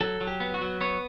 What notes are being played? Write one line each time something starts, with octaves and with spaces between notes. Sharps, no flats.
F#3 A4
F#3
G4
B3
F#4
F#3
B3 C#5